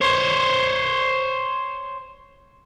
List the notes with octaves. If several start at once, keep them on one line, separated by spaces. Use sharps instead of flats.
C5 C#5